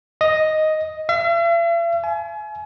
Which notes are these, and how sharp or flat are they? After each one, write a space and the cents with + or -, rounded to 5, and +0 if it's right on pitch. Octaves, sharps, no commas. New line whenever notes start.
D#5 +0
E5 +45
G#5 +35